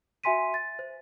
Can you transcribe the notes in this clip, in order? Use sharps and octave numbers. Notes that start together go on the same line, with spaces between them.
F#4 E5 G#5 C6 B6 D#7
A6
C5